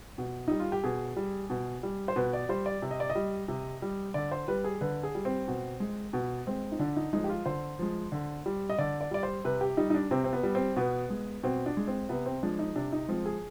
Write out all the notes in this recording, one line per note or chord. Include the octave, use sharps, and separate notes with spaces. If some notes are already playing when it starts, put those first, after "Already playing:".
B2
G3 D#4
F4
G4
B2 G#4
G3
B2
G3
C5
B2 B4
D5
G3 C5
D5
C3
D#5
D5
D#5
G3
C3
G3
D3 D5
C5
G3 B4
G#4
D3 B4
G#4
G3
C4
B2
G#3
B2
G#3 C4
D#4
D3 D4
D#4
F3 G#3 D#4
G4
F4
D3 C5
F3 G#3
D3
G3
D#5
D3 D5
D5
G3 D5
C5
C3 B4
G4
G3 D#4
D#4
D4
C3 C4
C4
B3
G3
C4
B2 B3
G#3
B2 C4
D4
G#3
C4
C3 B3
C4
F3 G#3 D4
D#4
C3 D4
D#4
F3 G#3 C4
G#4